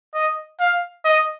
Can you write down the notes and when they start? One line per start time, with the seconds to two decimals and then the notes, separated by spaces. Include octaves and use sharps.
0.14 D#5
0.60 F5
1.05 D#5